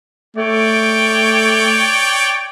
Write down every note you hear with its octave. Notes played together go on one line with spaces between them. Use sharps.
A3 C#5 D5 G5